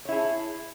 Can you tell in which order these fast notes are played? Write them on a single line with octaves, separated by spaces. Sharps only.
C#5 E4 G#4